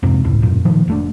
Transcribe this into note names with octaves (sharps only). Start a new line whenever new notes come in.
F2 G#2 C3
E1 C#2 A2
F#2 A#2
A#2 D#3 F3
F1 A3 D4